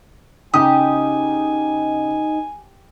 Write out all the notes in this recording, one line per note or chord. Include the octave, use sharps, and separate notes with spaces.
C#3 D#4 G4 G#5 D#6